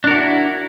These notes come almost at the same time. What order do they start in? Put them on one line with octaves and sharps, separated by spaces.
D4 A#4 F#4 E4